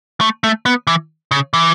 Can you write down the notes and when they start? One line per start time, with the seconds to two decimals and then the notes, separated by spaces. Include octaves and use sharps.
0.21 A3
0.44 A3
0.66 B3
0.87 E3
1.31 C#3
1.54 E3